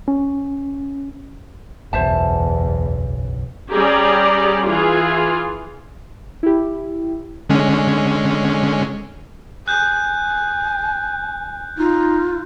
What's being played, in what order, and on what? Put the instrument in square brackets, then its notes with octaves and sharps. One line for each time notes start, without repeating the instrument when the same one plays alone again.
[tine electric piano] C#4
[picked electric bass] F#1 B1 [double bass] E2 [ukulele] C5 E5 A5
[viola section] G3 C#4 G4 G#4 D5 A#5
E3 F4 G#4
[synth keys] E4 G4
[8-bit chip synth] D3 G#3 C#4
[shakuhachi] G#5 [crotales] F#6 G6
[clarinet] D#4 [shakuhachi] F4